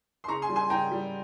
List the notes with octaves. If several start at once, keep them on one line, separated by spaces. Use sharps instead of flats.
C6
C#3 A#5 C#6
G#5 C6
G3
G#5 C6
C#3 G5 A#5
G3